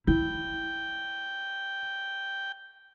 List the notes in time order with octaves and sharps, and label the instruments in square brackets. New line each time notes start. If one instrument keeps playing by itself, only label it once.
[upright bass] E4 [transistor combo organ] G5